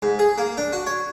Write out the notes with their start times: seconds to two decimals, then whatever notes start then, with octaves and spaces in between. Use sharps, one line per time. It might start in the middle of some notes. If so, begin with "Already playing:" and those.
0.02 G#2
0.19 G#4
0.38 A#3
0.57 D4
0.73 F#4
0.86 C#5